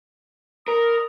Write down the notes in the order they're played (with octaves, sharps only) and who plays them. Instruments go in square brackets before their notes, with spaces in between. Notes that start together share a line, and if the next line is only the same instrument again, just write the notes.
[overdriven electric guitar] A#4 [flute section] D5 B5 D#6